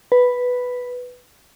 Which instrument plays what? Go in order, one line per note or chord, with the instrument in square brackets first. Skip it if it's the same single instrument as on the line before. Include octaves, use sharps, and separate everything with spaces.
[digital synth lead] B4